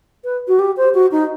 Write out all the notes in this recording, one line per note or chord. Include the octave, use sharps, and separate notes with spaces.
B4
F#4
G4
C5
F#4
D#4